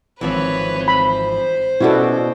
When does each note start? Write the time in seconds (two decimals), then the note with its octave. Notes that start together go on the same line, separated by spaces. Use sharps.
0.21 G#1 E3 F3 C4 B4 C#5
0.88 C5 B5
1.80 B2 C#4 E4 F#4 G4 A4 D5